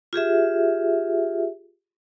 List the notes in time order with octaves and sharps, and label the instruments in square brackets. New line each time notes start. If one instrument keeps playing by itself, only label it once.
[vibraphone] F4 G4 G#4 E5